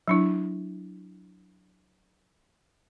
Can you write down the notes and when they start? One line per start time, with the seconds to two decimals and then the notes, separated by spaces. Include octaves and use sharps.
0.08 F#3 D4 E4